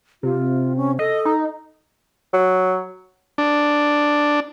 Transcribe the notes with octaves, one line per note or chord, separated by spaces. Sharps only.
C3 F4
C#4
A4 D#5
D#4
F#3
D4